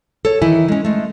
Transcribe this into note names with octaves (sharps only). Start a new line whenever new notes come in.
A4 C#5
D#3 E3 E4 G#5
G#3 C#4
G#3 A3